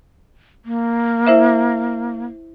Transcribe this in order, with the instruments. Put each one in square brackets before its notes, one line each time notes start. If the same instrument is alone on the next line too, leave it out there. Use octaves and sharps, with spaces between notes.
[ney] A#3
[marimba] E4 C5 E5